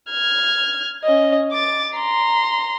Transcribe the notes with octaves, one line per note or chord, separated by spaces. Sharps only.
F6 G#6
C#4 D#5
D6 A6
A#5 C6